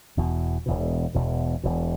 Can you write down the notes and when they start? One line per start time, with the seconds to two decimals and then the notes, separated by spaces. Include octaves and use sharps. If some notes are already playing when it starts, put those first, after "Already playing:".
0.17 E1 E2 B2
0.66 E1 E2 B2
1.15 E1 E2 B2
1.63 E1 E2 B2